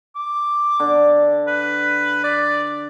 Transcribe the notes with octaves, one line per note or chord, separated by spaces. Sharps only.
D6
D3
B4
D5